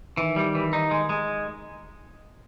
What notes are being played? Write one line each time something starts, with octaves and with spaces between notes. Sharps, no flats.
D#3 E3
G3
E3
D#4
G#3
G#3